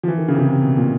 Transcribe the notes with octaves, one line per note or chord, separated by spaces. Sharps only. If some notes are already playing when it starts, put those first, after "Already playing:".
F3
E3
D#3
C#3
C3
C#3
C3
B2
A#2